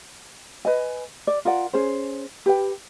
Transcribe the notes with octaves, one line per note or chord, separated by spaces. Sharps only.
B4 D#5 G#5
D5
F4 A#4 D5 F#5
C#4 G#4 C5
G4 B4 G5